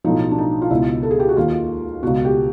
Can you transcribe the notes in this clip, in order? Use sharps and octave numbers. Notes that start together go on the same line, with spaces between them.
B1 A2 F3 D#4
D4
D#4
F4
C#2 B2 E4
A4
G#4
G4
F#4
D#2 D#3 F4
C#2 B2 F#4
G4